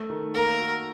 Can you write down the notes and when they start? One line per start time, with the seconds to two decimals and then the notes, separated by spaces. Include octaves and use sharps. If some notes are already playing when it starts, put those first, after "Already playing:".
Already playing: A3
0.10 D#3
0.34 A#3 A#4
0.60 F#4